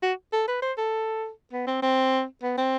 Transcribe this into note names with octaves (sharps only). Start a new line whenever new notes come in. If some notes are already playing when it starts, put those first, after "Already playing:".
F#4
A4
B4
C5
A4
B3
C4
C4
B3
C4